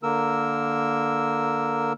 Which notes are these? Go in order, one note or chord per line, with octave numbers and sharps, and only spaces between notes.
D3 A#3 A#4 E6